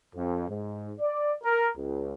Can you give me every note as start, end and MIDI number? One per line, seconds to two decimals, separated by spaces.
0.16 0.48 41
0.49 0.92 44
1.00 1.32 74
1.43 1.69 70
1.77 2.14 37